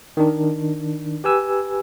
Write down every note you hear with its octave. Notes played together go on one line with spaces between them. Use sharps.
D#3 D4
G4 B4 G#5 E6